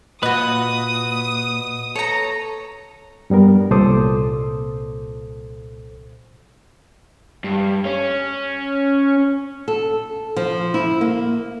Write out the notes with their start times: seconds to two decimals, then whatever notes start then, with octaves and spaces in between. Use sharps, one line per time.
0.23 A#2 F#4 B4 D#5 D#6
1.96 A4 C#5 A#5
3.30 G2 G3 B3 A#4
3.71 C2 A#2 A4 C5 D6 D#6
7.44 G2
7.85 C#4
9.68 A4
10.36 F3
10.74 E4
11.01 A#3